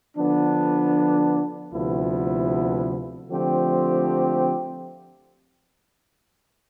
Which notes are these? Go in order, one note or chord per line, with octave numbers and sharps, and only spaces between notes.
D3 F3 B3 D4
D2 C3 F3 B3 E4
D3 F3 A3 C4 G4